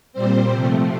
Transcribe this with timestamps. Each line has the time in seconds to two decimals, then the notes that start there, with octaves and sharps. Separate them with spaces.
0.13 A#2 G3 C4 C5
0.53 C3 F3 A3 C4